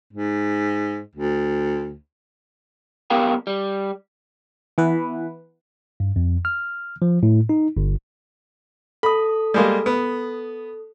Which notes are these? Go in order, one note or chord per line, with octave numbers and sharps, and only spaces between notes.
G#2
D2
B1 B3 G4 A#4 F5 G5
G3
E3 B3 B4
G2
F2
F6
F3
A2
D#4
G1
A4 B5 D#6
G3 G#3 A#3
B3